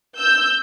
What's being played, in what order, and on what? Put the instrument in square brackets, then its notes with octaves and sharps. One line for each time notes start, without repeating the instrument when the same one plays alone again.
[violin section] E6 G6